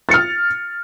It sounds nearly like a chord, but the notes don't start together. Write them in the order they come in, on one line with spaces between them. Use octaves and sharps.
A6 C#7 F6